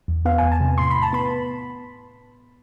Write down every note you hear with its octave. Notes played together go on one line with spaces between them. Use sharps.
E2
B3 F5
E2 G#5
A5
C3
A2 C6
B5
A2
A5
B3 B5